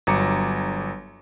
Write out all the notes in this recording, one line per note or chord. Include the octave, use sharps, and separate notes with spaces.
G1 F#3 A#5 D6 C#7